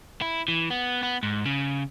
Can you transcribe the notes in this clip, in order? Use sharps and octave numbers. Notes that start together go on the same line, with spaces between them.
E4
E3
B3
B3
G#2
C#3